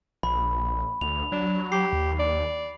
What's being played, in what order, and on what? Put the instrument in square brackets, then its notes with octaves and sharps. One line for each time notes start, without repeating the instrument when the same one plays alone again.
[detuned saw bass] A#1 [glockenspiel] B5
[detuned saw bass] D2 [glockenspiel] F7
[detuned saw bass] F#3 [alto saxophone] D4
[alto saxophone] G4 [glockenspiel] C7
[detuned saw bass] D#2
[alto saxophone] D5